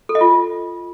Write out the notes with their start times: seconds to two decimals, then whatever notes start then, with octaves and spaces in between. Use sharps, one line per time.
0.09 A4
0.15 D#5
0.21 F4